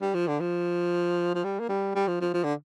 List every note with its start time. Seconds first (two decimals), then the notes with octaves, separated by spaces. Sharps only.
0.01 G3
0.14 F3
0.27 D3
0.40 F3
1.35 F3
1.44 G3
1.60 A#3
1.69 G3
1.95 G3
2.08 F3
2.21 F3
2.34 F3
2.44 D3